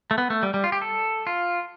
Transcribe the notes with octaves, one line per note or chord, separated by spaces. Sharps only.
A3
B3
A3
G3
G3
F4
G4
A4
F4